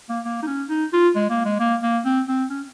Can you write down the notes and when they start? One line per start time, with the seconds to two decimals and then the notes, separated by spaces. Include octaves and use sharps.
0.09 A#3
0.25 A#3
0.43 D#4
0.47 C#4
0.69 D#4
0.93 F4
1.15 G#3
1.30 A#3
1.45 G#3
1.60 A#3
1.83 A#3
2.05 C4
2.28 C4
2.50 C#4